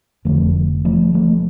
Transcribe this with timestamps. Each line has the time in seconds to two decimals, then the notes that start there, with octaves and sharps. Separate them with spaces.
0.25 F1 F2 D3 F3 A3
0.85 F3 A3
1.14 F3 A3